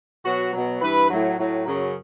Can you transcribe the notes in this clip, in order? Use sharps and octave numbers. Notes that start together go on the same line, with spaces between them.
B2 F#3 F#4
B2 F#3
G2 E3 B4
A2 F#3
A2 F#3
F#2 C#3 F#3